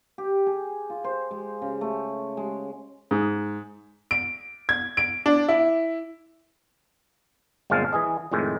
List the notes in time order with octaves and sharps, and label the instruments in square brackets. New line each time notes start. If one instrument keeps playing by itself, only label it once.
[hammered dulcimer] G4
G#4
F4
C5
G#3
C#3
A3
G#3
[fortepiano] G#2
[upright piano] D7
G#6
D7
D4
E4
[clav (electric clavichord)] G1 A#2 G#3 C4 F5 A5
E3 G#4 D#5
F2 A2 D#3 G#3